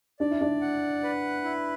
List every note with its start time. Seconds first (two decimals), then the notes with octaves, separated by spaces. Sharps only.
0.19 D4 D5
0.31 E4
0.41 D4
0.61 F#5
1.03 B4
1.44 E4